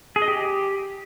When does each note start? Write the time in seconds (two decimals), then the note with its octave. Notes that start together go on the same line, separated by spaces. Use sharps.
0.16 G#4
0.22 D#5
0.28 G4